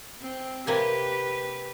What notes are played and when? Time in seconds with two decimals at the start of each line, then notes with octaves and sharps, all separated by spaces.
0.21 C4
0.67 C3 A#3 G4 B4 G#5